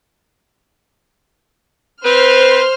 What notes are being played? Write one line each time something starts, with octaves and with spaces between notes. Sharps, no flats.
C4 B4 C5 F6